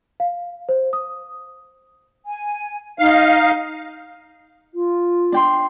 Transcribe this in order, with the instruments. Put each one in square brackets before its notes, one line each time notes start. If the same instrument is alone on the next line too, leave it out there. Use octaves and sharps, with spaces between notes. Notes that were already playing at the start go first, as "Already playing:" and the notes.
[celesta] F5
C5
D#6
[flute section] G#5
[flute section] D#4 [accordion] F5
[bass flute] F4
[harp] D4 G5 C6